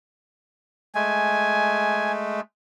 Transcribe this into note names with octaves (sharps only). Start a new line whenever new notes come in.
G#3 A3 G#5